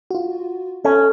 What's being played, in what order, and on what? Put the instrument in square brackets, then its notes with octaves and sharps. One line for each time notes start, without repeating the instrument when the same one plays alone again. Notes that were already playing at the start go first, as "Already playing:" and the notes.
[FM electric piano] F4 F#4
[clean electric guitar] C#4 [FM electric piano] A4